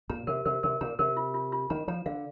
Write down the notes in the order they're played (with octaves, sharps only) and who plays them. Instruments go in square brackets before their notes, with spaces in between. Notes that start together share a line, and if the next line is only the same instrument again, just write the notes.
[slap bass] A#2 [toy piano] A#5
[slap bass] C3 [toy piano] A#4
[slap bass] C3 [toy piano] A#4
[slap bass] C3 [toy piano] A#4
[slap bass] A#2 [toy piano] A#5
[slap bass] C3 [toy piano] A#4
[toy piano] F4
F4
F4
[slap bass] D#3 [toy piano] A#5
[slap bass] F3 [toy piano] A#5
[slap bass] D3 [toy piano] F5